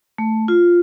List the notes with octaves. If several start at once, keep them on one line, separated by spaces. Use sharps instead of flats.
A3
F4